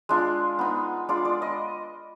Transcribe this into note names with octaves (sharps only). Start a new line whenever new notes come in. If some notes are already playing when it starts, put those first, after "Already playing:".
G#3 D4 F4
B3 D#4
G#3 D4 F4 D5
D5
D#5